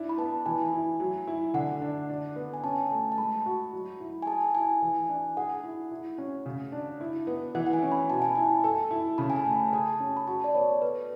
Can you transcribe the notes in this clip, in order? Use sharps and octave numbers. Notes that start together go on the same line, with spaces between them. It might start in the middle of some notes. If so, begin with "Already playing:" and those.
Already playing: D4 E4
B5
B3 A5
E3 G#5
E4
F#3
E4
D3 F#5
D4
D4
B3
G#5
C#4 A5
A3
A5
G#3 B5
F#4
F#3
E4
G#5
G#4 A5
E4 G#5
E3
D4
G#4 F#5
E4
E4
C#4
C#3
D4
E4
B3
E3 F#5
F#5
G#5
C#4
B5
B2 A5
G#5
E4 A5
A4
E4
C#3 B5
G#5
A5
A3
G#4 A5
C#4
B5
F#4 A5
D5
B3 C#5
A4 B4